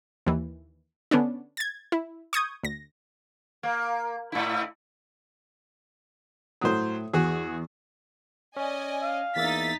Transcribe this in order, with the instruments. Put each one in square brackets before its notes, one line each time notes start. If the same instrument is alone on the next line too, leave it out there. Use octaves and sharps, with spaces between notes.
[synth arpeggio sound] D#2 E3
D3 B3 C#4 D4
G#6 A6
E4
C#6 D#6 G6 G#6
D2 A#6
[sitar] A#3
A2 E4
[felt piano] A2 D#6 [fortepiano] F#3 C5
[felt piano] E2 [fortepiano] F#4 G#4
[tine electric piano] C#4 [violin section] D5 D#5 G#5
[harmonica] F5
[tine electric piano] E2 A#3 E5 [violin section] D#4 A6 B6